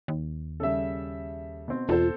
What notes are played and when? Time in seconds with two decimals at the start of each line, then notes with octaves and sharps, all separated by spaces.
0.08 D#2
0.60 C#3 G3 A4 E5
1.68 B2 C4
1.89 E1 F4 A4 C5